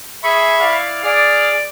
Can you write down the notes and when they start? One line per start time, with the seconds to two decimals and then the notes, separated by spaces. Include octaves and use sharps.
0.24 G#4 E5 B5 C#6
0.59 E4 D5 F5
1.03 G#4 D5 F6